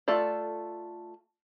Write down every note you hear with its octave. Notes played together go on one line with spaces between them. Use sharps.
A3 F4 A4 D5